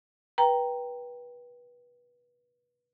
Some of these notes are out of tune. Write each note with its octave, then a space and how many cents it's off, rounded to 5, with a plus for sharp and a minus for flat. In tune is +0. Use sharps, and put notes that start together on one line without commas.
B4 -25 G5 +0 A#5 +0